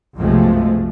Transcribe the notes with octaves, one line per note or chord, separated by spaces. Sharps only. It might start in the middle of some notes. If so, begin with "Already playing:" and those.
B1 F#2 C3 F3 G#3 A3